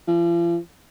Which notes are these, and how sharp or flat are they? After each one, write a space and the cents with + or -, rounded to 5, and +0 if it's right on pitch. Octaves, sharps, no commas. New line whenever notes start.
F3 -40